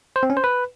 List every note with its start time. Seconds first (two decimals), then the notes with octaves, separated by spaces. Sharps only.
0.16 C5
0.23 C4
0.30 C#4
0.37 C5
0.44 B4